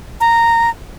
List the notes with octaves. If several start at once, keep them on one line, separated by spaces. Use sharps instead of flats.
A#5